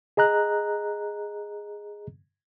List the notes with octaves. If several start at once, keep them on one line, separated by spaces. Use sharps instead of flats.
G#4 D#5 A#5 F#6